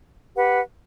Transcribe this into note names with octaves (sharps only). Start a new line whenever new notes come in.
G4 B4 F#5